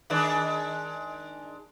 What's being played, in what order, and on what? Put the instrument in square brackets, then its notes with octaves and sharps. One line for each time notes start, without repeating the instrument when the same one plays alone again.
[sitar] D#3 G#3 D4